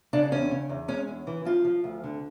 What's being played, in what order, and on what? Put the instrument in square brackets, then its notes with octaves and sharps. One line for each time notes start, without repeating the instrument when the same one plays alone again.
[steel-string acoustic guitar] C#3 D4
E2 C#4
C#3
E2
G#3 C#4
E2
E3
F3 F4
F3
D2
D3